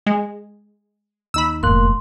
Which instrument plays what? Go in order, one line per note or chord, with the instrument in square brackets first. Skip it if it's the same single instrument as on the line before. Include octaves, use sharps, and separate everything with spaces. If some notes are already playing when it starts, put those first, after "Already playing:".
[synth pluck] G#3
[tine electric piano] D#2 D#4 [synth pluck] B5 E6
[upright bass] F1 G#2 [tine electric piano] E2 A#3 F#6 [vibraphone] C6